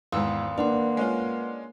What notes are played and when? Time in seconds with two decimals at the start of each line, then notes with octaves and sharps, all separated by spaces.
0.12 G#1 E2 G#2 F5 C6 D#6 E6
0.58 A#3 D4 B4 F#5 C6
0.97 G#3 C#4 F4